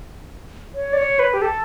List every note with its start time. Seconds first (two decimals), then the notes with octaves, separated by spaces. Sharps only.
0.75 C#5
0.93 D5
0.97 C#5
1.19 B4
1.34 G4
1.42 A4